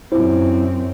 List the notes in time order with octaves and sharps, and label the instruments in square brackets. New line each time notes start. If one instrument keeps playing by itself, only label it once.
[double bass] F#2 C4 [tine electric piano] E4 F4 C5